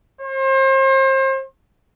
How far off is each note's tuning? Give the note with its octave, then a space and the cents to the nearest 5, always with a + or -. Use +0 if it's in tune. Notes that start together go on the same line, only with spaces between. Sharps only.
C5 +35